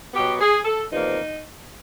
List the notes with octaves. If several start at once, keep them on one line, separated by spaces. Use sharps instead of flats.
B2 F#3 B3 G4
G#4
A4
E2 C3 F3 A#3 D#4